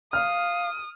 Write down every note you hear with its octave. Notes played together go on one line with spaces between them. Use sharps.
F5 D#6 F6